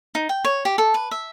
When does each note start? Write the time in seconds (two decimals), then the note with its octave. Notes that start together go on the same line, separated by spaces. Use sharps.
0.15 D#4
0.29 G5
0.45 C#5
0.65 G4
0.78 A4
0.94 B4
1.11 E5